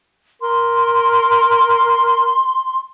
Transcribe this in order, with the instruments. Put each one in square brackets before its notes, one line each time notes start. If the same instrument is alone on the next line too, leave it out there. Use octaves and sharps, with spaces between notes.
[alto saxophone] A#4 [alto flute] C6